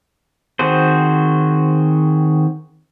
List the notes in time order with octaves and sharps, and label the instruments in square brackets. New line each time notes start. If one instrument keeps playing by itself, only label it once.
[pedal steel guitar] D#3 C4 F#4 G#4 C5